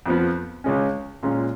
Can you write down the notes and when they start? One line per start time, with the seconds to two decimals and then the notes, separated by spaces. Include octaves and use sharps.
0.06 F2 F3 B3
0.64 C#2 C#3 G#3 C#4
1.23 A#2 G#3 C#4 F4